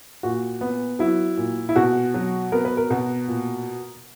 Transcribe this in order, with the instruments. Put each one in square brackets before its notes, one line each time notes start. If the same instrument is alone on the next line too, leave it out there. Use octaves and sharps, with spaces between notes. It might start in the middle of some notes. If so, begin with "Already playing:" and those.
[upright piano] A#2 F#4
B3
F#3 E4
A#2
E4
B2 F#4
F#3
B3 A#4
B4
A#4
B2
A#2